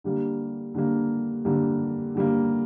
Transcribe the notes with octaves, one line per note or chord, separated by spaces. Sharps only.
D3 G3 A#3
D3 G3 A#3
D3 G3 A#3
D3 G3 A#3